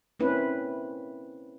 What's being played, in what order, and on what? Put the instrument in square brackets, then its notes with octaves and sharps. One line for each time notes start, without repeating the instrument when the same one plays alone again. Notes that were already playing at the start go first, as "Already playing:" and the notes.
[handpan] A#3 C4 C#4 E4 B4